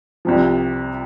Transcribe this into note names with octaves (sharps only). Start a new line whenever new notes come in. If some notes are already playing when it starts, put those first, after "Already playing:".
C2 C3 F3